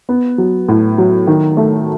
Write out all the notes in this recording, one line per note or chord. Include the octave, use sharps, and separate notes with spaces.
B3
F#3
A2
F#3
D#3
A3